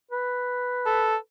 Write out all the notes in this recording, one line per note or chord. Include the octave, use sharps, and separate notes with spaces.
B4
A4